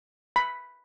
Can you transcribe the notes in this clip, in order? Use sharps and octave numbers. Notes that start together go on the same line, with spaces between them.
B5